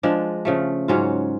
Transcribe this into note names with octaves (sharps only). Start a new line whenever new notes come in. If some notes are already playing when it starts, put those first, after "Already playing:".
F3 G#3 D4
C#3 F3 A3
G#2 F#3 C#4 F4